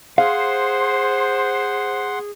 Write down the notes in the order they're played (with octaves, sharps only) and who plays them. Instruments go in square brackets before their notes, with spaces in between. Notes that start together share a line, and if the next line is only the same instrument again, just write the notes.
[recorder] G#4 [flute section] C5 [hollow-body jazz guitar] F5 [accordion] F#5 C6